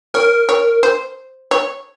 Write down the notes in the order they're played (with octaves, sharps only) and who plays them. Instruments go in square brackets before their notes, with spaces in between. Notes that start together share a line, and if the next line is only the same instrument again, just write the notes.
[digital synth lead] A#4 [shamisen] C#5
[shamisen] C#5
C5
C#5